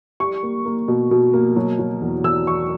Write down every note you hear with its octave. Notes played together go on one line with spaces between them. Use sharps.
G3 C#6
A#3
A#3
B2
B2
A#3
F#3
F#3
E2
E2 E6
E2 C#6